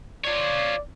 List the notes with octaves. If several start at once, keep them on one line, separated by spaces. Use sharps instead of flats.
F4 C#5 D5